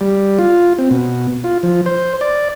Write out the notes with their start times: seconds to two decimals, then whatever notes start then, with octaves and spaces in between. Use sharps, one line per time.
0.01 G3
0.39 F4
0.78 C4
0.91 B2
1.44 F4
1.63 F3
1.86 C5
2.21 D5